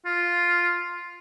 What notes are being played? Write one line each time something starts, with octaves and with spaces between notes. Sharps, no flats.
F4